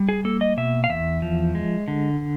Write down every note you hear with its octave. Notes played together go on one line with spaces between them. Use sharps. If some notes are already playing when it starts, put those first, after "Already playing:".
Already playing: G3
G#4
A#3 A4
D#5
B2 E5
F5
E2 E5
F3
G#3
D3